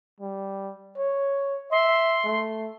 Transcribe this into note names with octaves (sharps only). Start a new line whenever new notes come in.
G3
C#5
E5 C6
A3